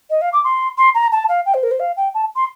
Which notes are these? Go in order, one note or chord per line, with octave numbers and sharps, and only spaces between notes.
D#5
F5
D6
C6
C6
A#5
A5
F5
G5
C5
A#4
C5
F5
G5
A5
C6